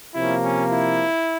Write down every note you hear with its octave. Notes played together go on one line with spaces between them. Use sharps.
C3 F3 A#3 C#4 E4
C#4
E4